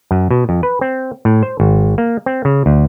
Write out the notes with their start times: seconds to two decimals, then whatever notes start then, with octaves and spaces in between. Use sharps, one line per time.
0.11 F#2
0.31 B2
0.49 F2
0.63 B4
0.81 C4
1.25 A2
1.43 C5
1.60 G#1
1.98 A#3
2.26 C4
2.45 C#3
2.66 D2